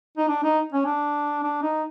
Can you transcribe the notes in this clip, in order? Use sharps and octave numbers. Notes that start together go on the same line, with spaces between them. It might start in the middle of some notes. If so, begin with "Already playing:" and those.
D#4
D4
D#4
C#4
D4
D4
D#4